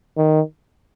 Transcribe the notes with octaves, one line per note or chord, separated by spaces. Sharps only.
D#3